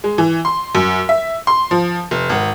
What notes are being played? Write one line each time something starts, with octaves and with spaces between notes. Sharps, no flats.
G#3
E3
C6
F#2
E5
C6
F3
F1
G#1